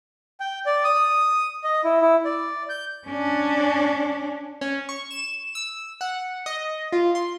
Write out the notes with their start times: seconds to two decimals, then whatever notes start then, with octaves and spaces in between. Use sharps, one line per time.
0.40 G5
0.66 D5
0.84 D#6
1.64 D#5
1.84 E4
2.01 E4
2.25 D5
2.69 G6
3.08 C#4 D4
4.61 C#4
4.89 C#6
5.11 E7
5.55 E6
6.01 F#5
6.46 D#5
6.92 F4
7.15 C6